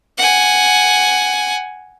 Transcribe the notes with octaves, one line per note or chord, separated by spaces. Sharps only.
F#5 G#5